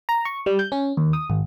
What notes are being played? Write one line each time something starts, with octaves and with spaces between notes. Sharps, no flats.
A#5
C#6
G3
G6
C#4
D#2
D#6
G#1